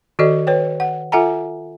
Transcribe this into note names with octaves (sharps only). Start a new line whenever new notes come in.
D#3 F#4 A4 D5 D#5
B4 C#5 G5
F#5
F4 A4 E5 F#5 G#5 A#5